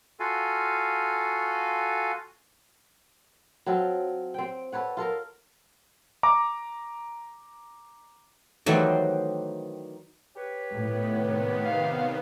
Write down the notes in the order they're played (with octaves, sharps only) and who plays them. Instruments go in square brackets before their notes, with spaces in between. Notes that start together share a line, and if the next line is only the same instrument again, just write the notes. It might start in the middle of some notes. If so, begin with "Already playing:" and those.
[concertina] F4 F#4 A4 F5 G#5
[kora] F#3 C4 F4 A4
C4 G5
A4 B4 C#5 F#5
F4 A4 A#4
[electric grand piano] A#5 D6
[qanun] D#3 G3 C5 [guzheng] E3 F#3 A3
[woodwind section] G4 B4 C#5
[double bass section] A2 [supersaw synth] D#3 B3
[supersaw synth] C3 D#3 B3
[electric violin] F5